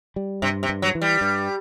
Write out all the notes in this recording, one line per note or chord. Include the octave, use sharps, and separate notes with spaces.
G3
G2 C3
C3
G2
F#3
E3
G3
G2